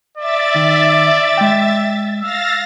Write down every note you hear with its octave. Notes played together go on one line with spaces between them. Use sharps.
D5 E5 A6
D#3
G#3 G5
F5 E6 A6 A#6